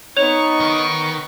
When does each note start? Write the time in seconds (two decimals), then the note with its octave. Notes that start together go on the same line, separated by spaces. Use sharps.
0.17 B3 D#4 C#5 C#6 F7
0.60 D#3